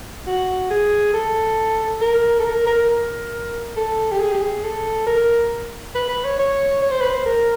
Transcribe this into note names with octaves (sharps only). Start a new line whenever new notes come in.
F#4
G#4
A4
A#4
A4
A#4
A#4
A#4
A4
G4
G#4
G4
G#4
A4
A#4
B4
B4
C#5
C#5
C#5
C5
B4
C5
A#4